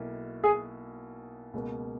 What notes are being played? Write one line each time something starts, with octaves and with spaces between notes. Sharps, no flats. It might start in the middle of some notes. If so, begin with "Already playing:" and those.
Already playing: B1 B2 A#3 E4
G#4
C#2 B2 A#3